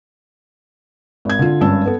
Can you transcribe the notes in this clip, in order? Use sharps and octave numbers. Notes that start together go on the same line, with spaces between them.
G#1 G#6
D3 F4
G#1 G2 C#4 A5 E6
B3 A4